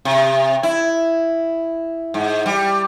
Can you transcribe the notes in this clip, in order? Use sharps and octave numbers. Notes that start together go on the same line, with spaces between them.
C3
E4
G#2
G3